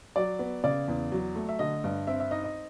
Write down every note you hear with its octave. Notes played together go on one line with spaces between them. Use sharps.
F#3 D5
B3
C#3 D5
E2
F#3
A3
E5
D3 D#5
G2
C4 E5
E5
D#4 D#5
D#5